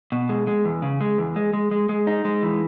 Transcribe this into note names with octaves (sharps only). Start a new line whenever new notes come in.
B2
G#3
G#3
E2
C#3
G#3
E2
G#3
G#3
G#3
G#3
D#4
G#3
E3